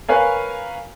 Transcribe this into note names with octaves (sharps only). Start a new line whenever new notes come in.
A#4 B4 C#5 F5 G#5